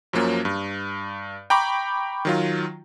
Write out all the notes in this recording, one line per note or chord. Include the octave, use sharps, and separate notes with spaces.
F#2 F3 F#3 A#3 C#4
G2
G5 A#5 B5 C#6 D6
D#3 F#3 F4